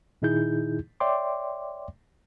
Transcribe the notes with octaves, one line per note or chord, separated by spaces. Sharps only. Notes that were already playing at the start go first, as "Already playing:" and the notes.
A#2 D#3 D#4 E4 G#4 G6
C#5 D5 E5 G5 C6 D6